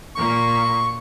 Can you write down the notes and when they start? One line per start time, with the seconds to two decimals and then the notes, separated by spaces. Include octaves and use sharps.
0.16 A#2 A#3 C#6